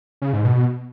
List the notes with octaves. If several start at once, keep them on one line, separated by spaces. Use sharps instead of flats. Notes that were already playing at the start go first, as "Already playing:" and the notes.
C#3
G#2
B2